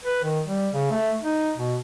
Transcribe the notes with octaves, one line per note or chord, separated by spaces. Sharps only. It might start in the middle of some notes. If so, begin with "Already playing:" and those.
B4
D#3
G3
C#3
A3
D#4
B2